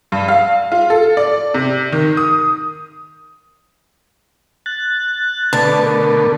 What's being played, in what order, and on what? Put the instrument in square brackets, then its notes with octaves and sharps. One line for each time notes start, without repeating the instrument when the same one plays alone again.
[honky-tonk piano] G2
F5
F4
A4
D5
C3
D#3
D#6
[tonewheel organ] F#6 A6
[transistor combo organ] B2 D3 A3 [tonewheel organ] B4 D5 [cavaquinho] A5
[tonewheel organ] A#4